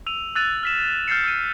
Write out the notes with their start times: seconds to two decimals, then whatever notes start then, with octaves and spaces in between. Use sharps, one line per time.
0.06 E6 D#7 F7
0.35 E6 F#6 A6 D#7 F7
0.63 F6 B6 E7
1.08 F6 G6 A6 C7 C#7
1.24 E6 F6 D#7